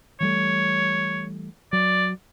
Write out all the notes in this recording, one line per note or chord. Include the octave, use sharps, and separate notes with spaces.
E3 G3 A3 C#5
F#3 D5